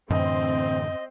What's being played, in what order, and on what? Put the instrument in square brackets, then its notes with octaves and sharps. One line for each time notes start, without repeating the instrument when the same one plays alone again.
[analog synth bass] F#2 [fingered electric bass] A2 D3 E3 [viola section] C4 [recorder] D#5